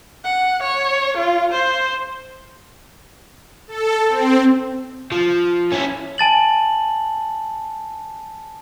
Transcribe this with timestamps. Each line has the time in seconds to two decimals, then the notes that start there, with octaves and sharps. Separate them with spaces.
0.24 F#5
0.62 C#5
1.17 F4
1.52 C5
3.68 A4
4.09 C4
5.12 F3
5.72 C#4 E4
6.18 G#5 A5 A6 F#7